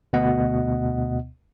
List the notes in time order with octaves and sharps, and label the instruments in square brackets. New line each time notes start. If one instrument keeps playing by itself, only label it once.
[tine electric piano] D2 B2 B3 D#5 F#5